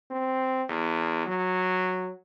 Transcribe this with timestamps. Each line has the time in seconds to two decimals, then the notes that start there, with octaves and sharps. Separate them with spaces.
0.10 C4
0.69 E2
1.26 F#3